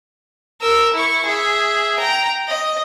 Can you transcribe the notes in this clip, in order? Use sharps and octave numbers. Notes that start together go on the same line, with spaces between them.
A#4 E6
E4 C#6
G#4 E5
G5 A#5
D#5